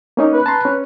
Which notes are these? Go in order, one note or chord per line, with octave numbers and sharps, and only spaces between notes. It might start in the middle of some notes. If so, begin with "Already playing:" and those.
A#3 C#4 D#4
B4
A5 A#5 C6
C#4